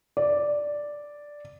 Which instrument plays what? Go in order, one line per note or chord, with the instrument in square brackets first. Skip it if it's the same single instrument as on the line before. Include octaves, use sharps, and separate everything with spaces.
[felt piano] D5